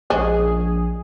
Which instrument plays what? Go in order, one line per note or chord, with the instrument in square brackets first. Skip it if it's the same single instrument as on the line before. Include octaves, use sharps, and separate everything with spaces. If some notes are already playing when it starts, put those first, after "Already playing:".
[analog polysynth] A#1 G#4 [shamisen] G#3 C#4 D4